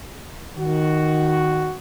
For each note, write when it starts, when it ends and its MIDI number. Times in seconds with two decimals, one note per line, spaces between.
0.57 1.72 51
0.57 1.72 66